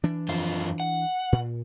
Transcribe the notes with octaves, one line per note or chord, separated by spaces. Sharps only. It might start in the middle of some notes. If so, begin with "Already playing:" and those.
E3 D4
F#2 F3 F4
F#5
A#2